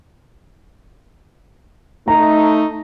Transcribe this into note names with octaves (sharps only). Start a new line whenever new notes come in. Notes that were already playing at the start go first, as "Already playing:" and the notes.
A3 D#4 A#5